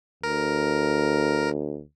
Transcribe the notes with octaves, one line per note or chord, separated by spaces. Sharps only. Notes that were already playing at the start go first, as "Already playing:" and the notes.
D2 A#4